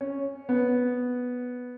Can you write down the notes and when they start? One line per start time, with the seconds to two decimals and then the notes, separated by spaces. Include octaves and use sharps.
0.01 C#4
0.49 B3